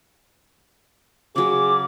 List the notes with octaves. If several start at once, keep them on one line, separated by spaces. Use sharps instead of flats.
C#3 F#3 G#4 D6